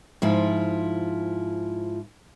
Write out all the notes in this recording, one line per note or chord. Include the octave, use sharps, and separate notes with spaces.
G#2 F3 E4 F4